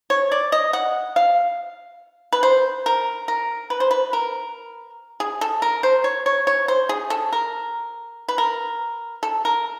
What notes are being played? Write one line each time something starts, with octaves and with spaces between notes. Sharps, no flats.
C#5
D5
D#5
F#5
F5
B4
C5
A#4
A#4
B4
C5
B4
A#4
G#4
A4
A#4
C5
C#5
C#5
C#5
C5
G#4
A4
A#4
B4
A#4
A4
A#4